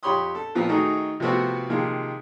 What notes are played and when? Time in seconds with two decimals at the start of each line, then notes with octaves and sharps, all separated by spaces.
0.03 F2 G4 C#5 B5 C6 D#6
0.35 A4
0.55 A#2 F3 B3 C4
0.69 D#3 A3 D#4 F#4 G#4
1.20 C3 F3 A3 B3 C4 F#4
1.70 C3 D#3 F3 G#3 A#3